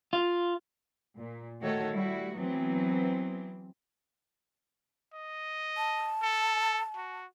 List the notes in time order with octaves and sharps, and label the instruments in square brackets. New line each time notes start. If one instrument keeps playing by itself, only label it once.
[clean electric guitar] F4
[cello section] A#2
D#3 A3 F#4 A4 C#5
G3 E4 F#4
E3 F#3 B3 C4
[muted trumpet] D#5
[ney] A5
[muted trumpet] A4
F#4